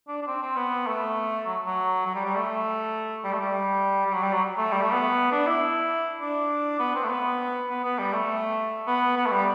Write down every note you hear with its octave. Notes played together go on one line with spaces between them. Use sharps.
D4
D4
C4
C4
B3
A3
F#3
F#3
F#3
G3
G3
A3
G3
A3
G3
G3
F#3
G3
F#3
A3
G3
A3
B3
D4
E4
D4
B3
C4
A3
B3
B3
B3
G3
A3
B3
B3
A3
G3